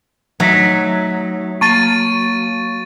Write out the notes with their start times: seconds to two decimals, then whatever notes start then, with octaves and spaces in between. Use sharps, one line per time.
0.40 F#3 A3 D#4 E5
1.61 A#3 A5 C#6 A6 D#7